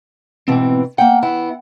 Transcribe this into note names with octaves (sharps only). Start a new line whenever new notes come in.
G#2 B2 E3 C4 G5
A#3 F#5 G5
B3 E4 F#5